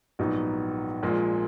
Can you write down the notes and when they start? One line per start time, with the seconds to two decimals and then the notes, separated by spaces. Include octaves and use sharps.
0.19 A#1 G#2 F#3 B3 D#4
1.03 A#1 A#2 F3 G#3